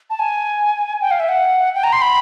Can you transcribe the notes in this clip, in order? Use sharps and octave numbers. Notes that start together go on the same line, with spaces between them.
A5
G#5
G5
F5
E5
F#5
G5
A#5
C6
B5